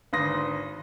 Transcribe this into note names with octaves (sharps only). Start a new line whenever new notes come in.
G#1 D3 B4 C6 D#6 A#6